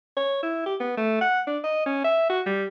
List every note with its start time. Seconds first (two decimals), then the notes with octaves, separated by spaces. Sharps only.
0.17 C#5
0.43 E4
0.66 G4
0.80 B3
0.97 A3
1.21 F#5
1.47 D4
1.64 D#5
1.86 C#4
2.04 E5
2.30 F#4
2.46 G3